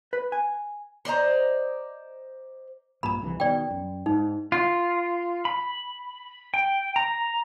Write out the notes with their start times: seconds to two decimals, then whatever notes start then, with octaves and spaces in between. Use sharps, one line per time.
0.13 B4
0.32 G#5
1.05 C5 D5 D#5 A#5
3.03 A#1 G2 A#2 A#5 B5
3.22 C2 F2 E3
3.40 B2 D#3 D5 G5
3.71 F#2
4.06 G#2 D#4
4.52 F4
5.45 B5
6.54 G5
6.96 A#5